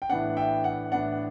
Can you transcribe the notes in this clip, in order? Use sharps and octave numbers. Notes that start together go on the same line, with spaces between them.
G5
A2 E3 B3 D4 F#5
E5 G5
F#5
A2 E3 B3 D4 F#5